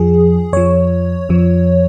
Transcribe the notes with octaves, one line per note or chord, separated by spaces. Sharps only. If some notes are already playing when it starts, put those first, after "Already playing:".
Already playing: F2 F3 G#4
F2 F3 C#5
F2 F3